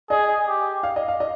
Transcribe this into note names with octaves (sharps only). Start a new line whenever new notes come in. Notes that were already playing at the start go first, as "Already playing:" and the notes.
G#4 D#5
G4
F5
D#5
F5
D#5